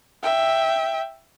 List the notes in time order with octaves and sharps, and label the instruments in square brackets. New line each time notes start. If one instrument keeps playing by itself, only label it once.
[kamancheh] E5 G5